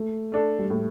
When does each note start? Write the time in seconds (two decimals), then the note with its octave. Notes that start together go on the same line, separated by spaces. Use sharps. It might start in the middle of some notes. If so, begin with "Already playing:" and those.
Already playing: A3
0.32 A3 D4 A4
0.59 G3
0.70 A2 A3